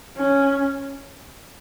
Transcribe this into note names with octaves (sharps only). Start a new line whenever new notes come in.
C#4